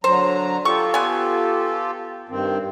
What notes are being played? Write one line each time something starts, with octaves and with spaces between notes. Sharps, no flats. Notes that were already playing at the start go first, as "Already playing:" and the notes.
D3 F#3 C5 A#5
F4 G4 A4 C#6
B3 G#5
G2 D#3 C4